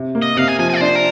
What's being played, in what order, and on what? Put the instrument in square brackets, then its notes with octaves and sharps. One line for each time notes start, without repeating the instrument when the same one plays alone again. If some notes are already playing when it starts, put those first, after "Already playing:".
Already playing: [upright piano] C3
A#3
[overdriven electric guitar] D#5
[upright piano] C3 [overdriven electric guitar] F5
[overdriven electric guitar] G#5
[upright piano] F3 [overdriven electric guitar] G#5
[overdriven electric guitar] G#5
D5
[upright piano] D4 [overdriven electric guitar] C5
[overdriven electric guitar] A#4